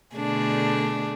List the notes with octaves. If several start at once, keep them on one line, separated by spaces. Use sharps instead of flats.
B2 D3 A3 D4 G#4